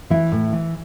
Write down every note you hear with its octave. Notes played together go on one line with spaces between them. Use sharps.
E3 E4
A2
E3